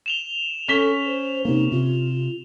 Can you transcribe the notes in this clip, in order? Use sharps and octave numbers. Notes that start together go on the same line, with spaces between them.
E7 F7 G7
C#4 A4 B6 E7 G7
C5
C3 A#3 D#4
C3 F4